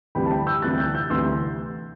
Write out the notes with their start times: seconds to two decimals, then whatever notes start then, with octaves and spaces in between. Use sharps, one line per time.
0.15 D2 C3 E3 G3 G5 B5
0.26 A5
0.31 G5 B5
0.47 E6 G6
0.62 D2 C3 E3 G3 F#6 A6
0.78 E6 G6
0.94 E6 G6
1.10 D2 C3 E3 G3 C6 E6